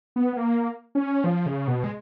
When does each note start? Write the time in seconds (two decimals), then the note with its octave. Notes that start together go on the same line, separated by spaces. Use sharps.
0.16 B3
0.33 B3
0.37 A#3
0.95 C#4
1.24 F3
1.46 C#3
1.68 B2
1.84 G#3